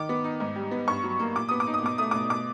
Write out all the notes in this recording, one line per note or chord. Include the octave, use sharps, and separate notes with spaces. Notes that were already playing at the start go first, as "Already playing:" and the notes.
Already playing: D#3 D6
B3
D#4
G#2
G3
B3
G2 C#6
F#3
A#3
A#2 D6
B3 D#6
D6
D#4
D#6
B2 D6
A3 D#6
D6
B2
B2 D6